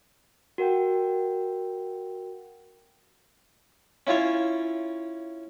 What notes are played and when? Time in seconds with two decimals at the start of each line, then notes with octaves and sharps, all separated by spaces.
0.58 F#4 A#4 F#5 G5
4.07 C#4 E4 F4 C#5